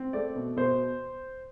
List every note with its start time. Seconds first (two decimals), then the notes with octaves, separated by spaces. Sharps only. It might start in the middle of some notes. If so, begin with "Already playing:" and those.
Already playing: C4
0.13 A3 D5
0.36 B2
0.57 B2 C5